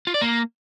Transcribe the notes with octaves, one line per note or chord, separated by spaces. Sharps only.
F4
D5
A#3